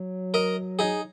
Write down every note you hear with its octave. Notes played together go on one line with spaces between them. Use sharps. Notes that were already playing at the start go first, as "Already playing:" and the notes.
Already playing: F#3
A#4 D#5
D#4 G#4